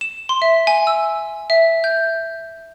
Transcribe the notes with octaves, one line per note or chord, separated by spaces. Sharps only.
E7
C6
E5
G#5
E6
E5
G6